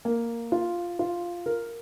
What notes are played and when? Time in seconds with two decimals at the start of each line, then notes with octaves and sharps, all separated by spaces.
0.05 A#3
0.52 F4
0.99 F4
1.46 A#4